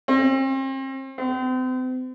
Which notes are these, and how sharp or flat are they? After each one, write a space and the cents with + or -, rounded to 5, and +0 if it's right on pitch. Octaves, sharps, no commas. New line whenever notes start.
C4 +40
C4 -40